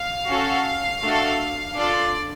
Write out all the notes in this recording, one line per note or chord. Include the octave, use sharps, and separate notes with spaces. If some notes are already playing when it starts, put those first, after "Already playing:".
Already playing: F5
C#4 F#4 A4
A3 D4 F#4 A4
D4 F4 A4 D5